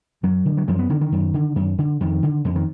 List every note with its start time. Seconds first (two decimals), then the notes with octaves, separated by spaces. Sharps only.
0.23 F#2 F#3
0.45 D3
0.57 F#3
0.68 F#2 F3
0.79 B3
0.89 D3 D#3
1.01 D#3
1.12 F#2
1.34 D3
1.56 F#2
1.78 D3
2.00 F2 D#3
2.23 D3
2.45 F2 D3
2.56 D#3